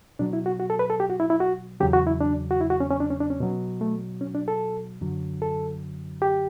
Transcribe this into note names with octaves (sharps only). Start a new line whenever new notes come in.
B2 F#3 D4
E4
F#4
F#4
A4
B4
A4
G4
F#4
E4
E4
F#4
E2 C#3 F#3 G4
F#4
E4
D4
F#4
E4
F#4
C#4
C#4
D4
C#4
D4
C#4
B2 F#3
A3
C#4
D4
A4
F#2 D3 F#3
A4
G4